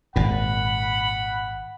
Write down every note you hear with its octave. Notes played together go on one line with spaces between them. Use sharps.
G#1 A#2 F#5 B5